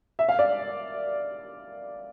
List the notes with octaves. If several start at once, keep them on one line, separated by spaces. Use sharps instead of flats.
E5
F5
D5